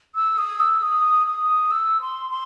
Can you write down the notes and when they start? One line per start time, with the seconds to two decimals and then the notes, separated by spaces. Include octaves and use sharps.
0.15 E6
0.37 D#6
0.59 E6
0.82 D#6
1.26 D#6
1.71 E6
2.01 C6
2.30 C6